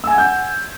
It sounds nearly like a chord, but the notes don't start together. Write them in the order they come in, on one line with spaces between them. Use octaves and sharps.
E6 G#5 G#6 F#5 G6